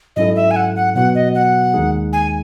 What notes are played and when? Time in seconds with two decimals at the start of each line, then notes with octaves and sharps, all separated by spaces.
0.16 G#2 F#3 C#4 E4 A4 D#5
0.36 E5
0.51 G#5
0.56 F#5
0.76 F#5
0.95 B2 F#3 B3 F#4 F#5
1.15 D#5
1.35 F#5
1.74 D#2 D#3 G#3 D#4 G#4
2.13 G#5